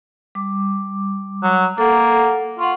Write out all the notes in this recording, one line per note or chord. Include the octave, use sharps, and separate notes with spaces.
G3 D6
F#3
A#3 A4 F#5
F4 F#5 C#6